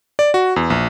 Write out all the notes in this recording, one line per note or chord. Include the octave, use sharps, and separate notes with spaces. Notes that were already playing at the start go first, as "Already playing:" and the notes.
D5
F#4
E2
A#1